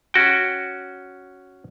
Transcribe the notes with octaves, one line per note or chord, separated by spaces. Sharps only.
C#4 F#4 G5